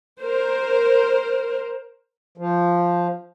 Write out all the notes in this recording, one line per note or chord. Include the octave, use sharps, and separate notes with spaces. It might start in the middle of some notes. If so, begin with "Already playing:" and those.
A#4 C5
F3